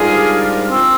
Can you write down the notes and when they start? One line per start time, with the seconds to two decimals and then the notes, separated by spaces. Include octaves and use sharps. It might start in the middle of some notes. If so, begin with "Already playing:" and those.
Already playing: G#2 G3 D4 F4 G#4 A#4
0.71 C4